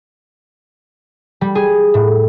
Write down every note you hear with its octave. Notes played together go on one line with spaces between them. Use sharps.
G3
G#4
A2